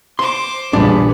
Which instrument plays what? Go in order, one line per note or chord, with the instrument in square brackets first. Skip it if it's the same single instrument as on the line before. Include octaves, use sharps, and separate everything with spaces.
[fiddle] C5 D6 [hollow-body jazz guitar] C6
[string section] A#1 E2 A#2 [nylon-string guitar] C#3 G3 C#4 [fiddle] B3 [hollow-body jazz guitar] D4